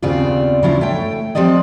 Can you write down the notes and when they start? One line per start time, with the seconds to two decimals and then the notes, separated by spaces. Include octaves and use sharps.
0.02 D#2 C#3 B3 C4 F4 D5
0.63 C#3 F#3 D4 E4 F4
0.81 A3 C#5 G5
1.35 F3 C4 G4 D5 D#5